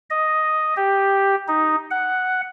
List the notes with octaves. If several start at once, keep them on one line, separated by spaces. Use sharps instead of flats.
D#5
G4
D#4
F#5